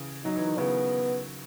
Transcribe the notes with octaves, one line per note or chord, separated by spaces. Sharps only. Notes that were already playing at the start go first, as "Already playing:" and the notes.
Already playing: C#3 E3
F#3 D#4
E3
D#3
C#3 E3 B3